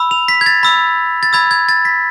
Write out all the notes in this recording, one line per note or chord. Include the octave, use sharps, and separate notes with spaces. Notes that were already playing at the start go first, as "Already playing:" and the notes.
Already playing: B5 E6
F7
B6
G#6
A6
B5 E6
A6
B5 E6 G#6
G#6
A6
B6